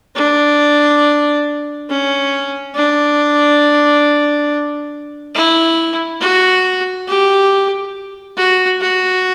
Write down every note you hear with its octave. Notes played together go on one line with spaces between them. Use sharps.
D4
C#4
D4
E4
F#4
G4
F#4
F#4